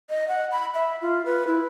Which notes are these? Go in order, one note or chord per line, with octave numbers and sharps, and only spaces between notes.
D#5
F#5
B5
E5
F4
B4
E4